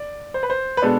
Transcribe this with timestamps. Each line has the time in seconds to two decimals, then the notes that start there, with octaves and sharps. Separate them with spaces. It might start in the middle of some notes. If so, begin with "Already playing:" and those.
Already playing: D5
0.34 C5
0.43 B4
0.50 C5
0.77 B4
0.82 B2 G#3 B3 D4 A4